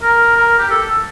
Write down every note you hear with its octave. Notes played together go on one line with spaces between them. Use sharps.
A#4
A#4
G4
A4